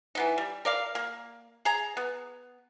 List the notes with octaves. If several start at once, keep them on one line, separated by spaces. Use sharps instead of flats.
E3 B3 D#4
G3
A#4 D5 F5
A#3
G#4 A#5
B3